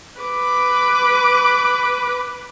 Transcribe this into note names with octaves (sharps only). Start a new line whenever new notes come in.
B4 D6